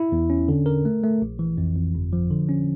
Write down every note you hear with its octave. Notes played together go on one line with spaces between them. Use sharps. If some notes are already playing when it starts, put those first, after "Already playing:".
Already playing: E4
E2
C#4
D3
A#4
A3
A3
A#1
E3
F2
F2
G1
F3
D3
C#4